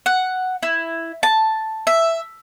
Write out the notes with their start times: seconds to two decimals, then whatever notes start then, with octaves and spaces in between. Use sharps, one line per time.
0.06 F#5
0.63 E4
1.23 A5
1.87 E5